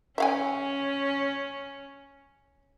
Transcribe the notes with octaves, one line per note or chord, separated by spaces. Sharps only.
C#4 E5 F5 G#5